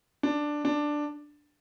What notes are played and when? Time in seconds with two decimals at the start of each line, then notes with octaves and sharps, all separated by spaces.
0.23 D4
0.65 D4